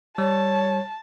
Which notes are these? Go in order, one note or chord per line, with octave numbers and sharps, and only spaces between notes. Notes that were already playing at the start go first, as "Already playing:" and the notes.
G3 C#5 A5